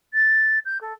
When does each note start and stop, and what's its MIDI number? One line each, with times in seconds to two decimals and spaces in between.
0.14 0.59 93
0.65 0.78 91
0.81 0.93 69